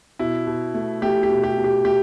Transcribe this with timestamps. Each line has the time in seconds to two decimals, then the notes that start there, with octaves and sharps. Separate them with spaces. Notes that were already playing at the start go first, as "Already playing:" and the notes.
0.19 B2 E4
0.47 B2
0.74 A3
1.02 A3 G4
1.23 G4
1.30 B2
1.44 G4
1.57 B2
1.64 G4
1.85 A3 G4